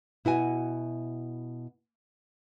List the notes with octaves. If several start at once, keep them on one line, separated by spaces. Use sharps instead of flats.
B2 E4 F#4 G#5